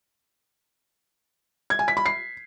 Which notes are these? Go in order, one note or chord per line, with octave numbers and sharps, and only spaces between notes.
G#6
G#5
B6
B5
C7